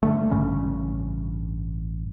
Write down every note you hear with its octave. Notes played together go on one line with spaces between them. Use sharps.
G2 D3 A3
A1 G2 C#3 C#4